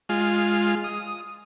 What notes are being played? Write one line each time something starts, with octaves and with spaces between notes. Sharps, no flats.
G#3 F4
D#6